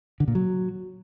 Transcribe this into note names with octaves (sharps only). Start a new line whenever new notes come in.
D3
A#2
F#3